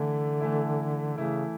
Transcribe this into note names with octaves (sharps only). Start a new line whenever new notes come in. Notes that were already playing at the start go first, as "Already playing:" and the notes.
Already playing: D3 E3 A3 E4
E3 A3 E4
C#3 E3 A3 E4